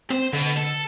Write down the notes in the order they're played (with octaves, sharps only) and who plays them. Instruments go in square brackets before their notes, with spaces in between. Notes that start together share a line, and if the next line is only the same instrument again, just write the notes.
[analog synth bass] C4 [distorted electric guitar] C5
[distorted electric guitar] B2 B3 [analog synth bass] D3
[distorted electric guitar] A4